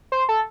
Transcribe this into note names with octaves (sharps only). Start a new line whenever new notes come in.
C5
A4